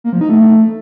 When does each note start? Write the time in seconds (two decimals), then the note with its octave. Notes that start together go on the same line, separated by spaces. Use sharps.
0.04 A#3
0.13 F3
0.21 D#4
0.30 A3